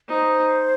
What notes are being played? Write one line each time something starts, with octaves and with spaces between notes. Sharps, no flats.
D#4 C5